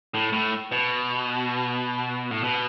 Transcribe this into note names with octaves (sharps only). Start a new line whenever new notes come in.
A2
A2
B2
A2
B2